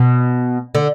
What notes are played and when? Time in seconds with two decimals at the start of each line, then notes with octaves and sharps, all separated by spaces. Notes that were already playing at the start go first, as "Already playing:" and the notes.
Already playing: B2
0.75 D3